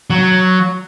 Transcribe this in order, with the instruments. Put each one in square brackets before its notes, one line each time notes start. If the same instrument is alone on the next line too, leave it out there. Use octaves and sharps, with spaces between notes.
[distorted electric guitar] F#3